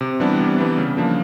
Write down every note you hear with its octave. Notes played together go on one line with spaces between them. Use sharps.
C3
E3 G3 B3 D4
C3
E3 G3 B3 D4
C#3
F3 A#3 D4